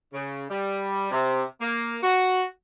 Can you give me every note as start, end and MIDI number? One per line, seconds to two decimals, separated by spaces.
0.13 0.45 49
0.50 1.08 55
1.11 1.43 48
1.61 1.97 58
2.02 2.43 66